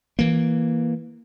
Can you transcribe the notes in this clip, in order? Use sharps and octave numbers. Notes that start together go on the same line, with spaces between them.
E3 A#3